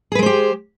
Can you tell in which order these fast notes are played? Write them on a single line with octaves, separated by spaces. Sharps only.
G#4 B4 G#3 C5 G4